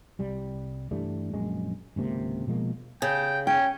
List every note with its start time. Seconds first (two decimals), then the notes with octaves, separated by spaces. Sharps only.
0.19 C2 G3
0.91 G2 E3 G3 A3
1.34 A#1 F#2 G#3
1.96 G#1 C#2 C3 A#3
2.47 B2 F3 G#3 A#3
3.02 C#3 G5
3.47 C#4 G5